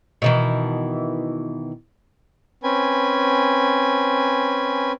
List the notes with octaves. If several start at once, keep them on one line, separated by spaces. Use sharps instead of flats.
B2 D#3 E3
C4 C#4 B4 G#5